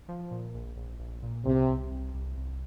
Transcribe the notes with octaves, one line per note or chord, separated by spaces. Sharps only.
F3
A#2
A#1
A#1
A#1
A#2
C2 C3
C2
C2
C2
C2